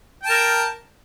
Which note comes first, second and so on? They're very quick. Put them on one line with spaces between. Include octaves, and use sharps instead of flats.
G5 A5 A#4